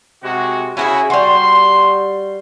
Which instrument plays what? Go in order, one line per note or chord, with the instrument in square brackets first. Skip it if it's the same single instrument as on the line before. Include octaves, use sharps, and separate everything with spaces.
[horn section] C3 G#3 F#4
[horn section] C#3 E4 F#4 [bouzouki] C#4 D4 G#4
[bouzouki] G3 F#4 [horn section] C6